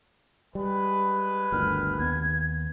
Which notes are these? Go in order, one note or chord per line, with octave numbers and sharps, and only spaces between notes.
G3 G#3 B4
G1 D2 D#3 F6
D#2 B3 G#6